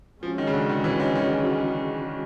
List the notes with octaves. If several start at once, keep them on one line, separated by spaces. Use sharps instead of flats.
F3 G#3 C#4 F#4
D#3
C#3
D3
D#3
E3
D#3
D#3